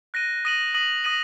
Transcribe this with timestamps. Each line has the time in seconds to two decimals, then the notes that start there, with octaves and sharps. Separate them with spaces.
0.14 F#6 A#6 D#7
0.45 D#6 A#6 D#7 F#7
0.75 D#6 A#6 D#7 F#7
1.04 D#6 A#6 D#7 F#7